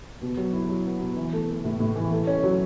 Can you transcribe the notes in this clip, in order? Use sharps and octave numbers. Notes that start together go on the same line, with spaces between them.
B2
F#3
E4
F#3
B3
B2
E3
A3
A3
A2
A2
E3
A3
C#4
F#3